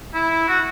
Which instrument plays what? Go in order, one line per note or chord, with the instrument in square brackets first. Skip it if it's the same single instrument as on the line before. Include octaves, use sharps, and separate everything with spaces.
[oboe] E4
F#4